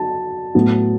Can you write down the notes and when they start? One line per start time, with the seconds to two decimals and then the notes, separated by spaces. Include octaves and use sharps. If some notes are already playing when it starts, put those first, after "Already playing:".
Already playing: F#3 A5
0.55 A2 F#3 B3